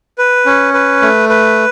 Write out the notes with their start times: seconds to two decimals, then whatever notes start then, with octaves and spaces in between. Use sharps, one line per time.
0.18 B4
0.46 C#4
0.74 B4
1.02 A3
1.29 B4